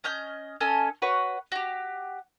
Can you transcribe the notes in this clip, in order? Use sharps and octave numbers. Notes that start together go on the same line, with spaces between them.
C#4 D#5 F6 G6
C#4 A4 D#5 G#5
F#4 B4 C#5 F#5
F#4 G4